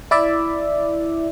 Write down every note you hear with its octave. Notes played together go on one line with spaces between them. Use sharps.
E4 D5 E5